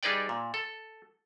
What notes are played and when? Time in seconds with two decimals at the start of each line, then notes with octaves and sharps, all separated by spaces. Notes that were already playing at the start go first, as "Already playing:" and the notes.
0.03 G3 D#4 G#4 B4 D5 G5
0.29 A#2
0.54 A4